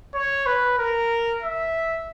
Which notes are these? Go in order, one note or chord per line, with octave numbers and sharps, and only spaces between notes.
C#5
B4
A#4
E5